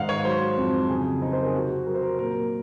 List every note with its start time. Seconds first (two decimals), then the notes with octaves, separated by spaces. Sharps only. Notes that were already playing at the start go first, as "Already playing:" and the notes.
Already playing: G#2 D#3 D#5 F5 F#5
0.09 C#5
0.25 F#3 C5
0.57 F2
0.90 C#3 G#4
1.22 C4 D#4
1.33 C5
1.40 A#4
1.47 G#4
1.54 C3 F#4
1.86 F#3 A#4
1.95 C5
2.02 A#4
2.19 A#2 A#4